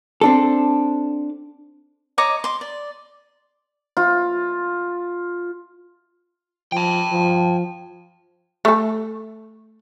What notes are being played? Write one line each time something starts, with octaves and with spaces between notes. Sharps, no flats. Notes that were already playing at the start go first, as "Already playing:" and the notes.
C4 D4 A4
C#5 D#5 A#5 D6
C6 D6
D5
F4
F3 G5 A5
F3
A3 A4